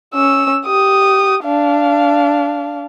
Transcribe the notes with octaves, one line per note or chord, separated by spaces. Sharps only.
C#4 E6
G4 D#6
D4 F5